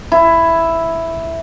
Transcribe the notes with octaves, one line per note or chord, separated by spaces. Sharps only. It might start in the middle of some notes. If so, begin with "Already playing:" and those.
E4